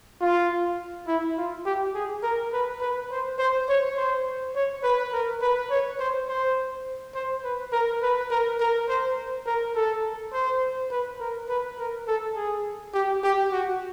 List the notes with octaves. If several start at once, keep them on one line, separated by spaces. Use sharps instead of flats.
F4
E4
F4
G4
G#4
A#4
B4
B4
C5
C5
C#5
C5
C#5
B4
A#4
B4
C#5
C5
C5
C5
B4
A#4
B4
A#4
A#4
C5
A#4
A4
C5
B4
A#4
B4
A#4
A4
G#4
G4
G4
F#4